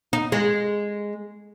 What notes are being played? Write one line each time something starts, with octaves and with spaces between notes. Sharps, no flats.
D#4
G#3